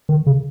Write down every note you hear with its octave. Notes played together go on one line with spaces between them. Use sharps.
D#3
C#3